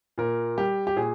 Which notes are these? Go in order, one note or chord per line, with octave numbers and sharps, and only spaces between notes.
A#2 A#4
G3 G4
G4
A#2 G#4